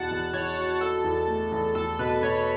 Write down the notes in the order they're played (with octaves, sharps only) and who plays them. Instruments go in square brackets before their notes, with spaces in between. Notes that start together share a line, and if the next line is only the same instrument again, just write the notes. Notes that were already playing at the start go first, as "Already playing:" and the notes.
Already playing: [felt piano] E2 B2 F#4 [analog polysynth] F#5 A5
[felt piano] E2
[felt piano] E2 [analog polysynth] C#5
[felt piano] F#4
[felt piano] F#4 [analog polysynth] A4
[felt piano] E2
A3
E2
[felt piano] E2 [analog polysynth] A4
[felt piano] B2 [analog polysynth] B4
[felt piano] B2 [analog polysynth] C#5